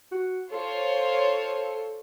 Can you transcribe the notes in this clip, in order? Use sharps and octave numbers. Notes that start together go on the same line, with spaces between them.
F#4
F4 A4 C5 C#5